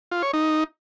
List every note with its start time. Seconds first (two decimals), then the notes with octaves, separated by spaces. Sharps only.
0.11 F4
0.22 C#5
0.33 D#4